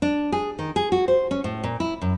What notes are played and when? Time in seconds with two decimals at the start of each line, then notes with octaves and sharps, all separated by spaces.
0.02 D4
0.32 G#4
0.59 D#3
0.76 G#4
0.92 F#4
1.08 C5
1.31 C#4
1.44 A2
1.64 A#2
1.80 E4
2.02 F#2